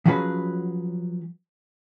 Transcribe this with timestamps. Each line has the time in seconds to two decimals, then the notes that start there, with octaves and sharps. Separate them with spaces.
0.05 F3 F#3 C#4 F#4 G#4 B4